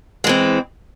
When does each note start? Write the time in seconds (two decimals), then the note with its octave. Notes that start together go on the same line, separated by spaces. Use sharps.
0.24 G#3
0.27 E3
0.29 C4